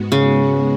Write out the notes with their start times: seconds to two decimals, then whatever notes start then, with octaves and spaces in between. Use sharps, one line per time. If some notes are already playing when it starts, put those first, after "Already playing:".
Already playing: G#2 G#3 B3 F#4
0.12 C#3